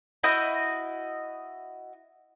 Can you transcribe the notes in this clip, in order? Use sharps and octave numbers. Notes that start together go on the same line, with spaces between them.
E4 F#4 D#5 G6